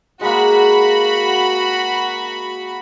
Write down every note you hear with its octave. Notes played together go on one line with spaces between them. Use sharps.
G#3 A#3 F#4 B5